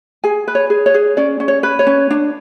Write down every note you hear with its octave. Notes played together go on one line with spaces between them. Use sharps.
G#4 G#5
B4
C#5
G#4
C#5
G#4
C#4 D5
C#4
C#5
B4
C#5
C#4
D4